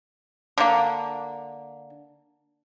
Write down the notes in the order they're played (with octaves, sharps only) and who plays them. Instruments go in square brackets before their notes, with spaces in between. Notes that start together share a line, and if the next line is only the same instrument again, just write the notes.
[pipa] D3 A#3